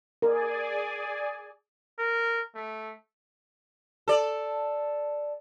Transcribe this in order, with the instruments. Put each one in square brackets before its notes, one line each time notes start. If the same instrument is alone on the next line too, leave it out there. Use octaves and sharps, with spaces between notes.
[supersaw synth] G#4 D5 G#5 [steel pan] A#4
[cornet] A#4
A3
[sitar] A4 D5